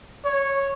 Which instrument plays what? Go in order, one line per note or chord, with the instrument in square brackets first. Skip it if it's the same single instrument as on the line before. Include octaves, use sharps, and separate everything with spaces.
[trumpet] C#5